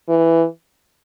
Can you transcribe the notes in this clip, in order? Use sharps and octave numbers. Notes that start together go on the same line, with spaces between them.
E3